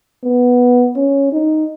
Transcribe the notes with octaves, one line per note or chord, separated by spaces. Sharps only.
B3
C#4
D#4